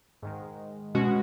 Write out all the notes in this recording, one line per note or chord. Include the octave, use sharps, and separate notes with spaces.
G#2 D#3 G#3
B2 G#3 C#4 F#4